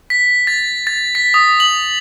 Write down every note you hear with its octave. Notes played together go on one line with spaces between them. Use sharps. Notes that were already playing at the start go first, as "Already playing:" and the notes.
B6
A6
A6
B6
D#6
F#7